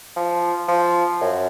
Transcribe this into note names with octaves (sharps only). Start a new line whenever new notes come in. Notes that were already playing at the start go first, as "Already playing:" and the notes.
F3
F3
F#2